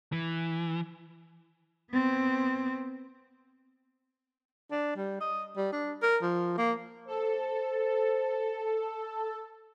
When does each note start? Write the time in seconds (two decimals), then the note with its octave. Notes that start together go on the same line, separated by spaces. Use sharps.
0.12 E3
1.92 B3 C4
4.71 D4
4.96 G3
5.21 D#5
5.57 G3
5.72 D4
6.03 A#4
6.22 F3
6.58 A#3
7.07 A4 C5